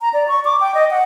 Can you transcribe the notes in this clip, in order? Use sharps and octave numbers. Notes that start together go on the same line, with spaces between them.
A#5
D5
C#6
D6
G5
D#5
F#5